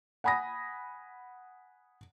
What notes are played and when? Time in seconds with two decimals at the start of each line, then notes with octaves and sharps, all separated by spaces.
0.24 F#5 G#5 B5 D#6 A#6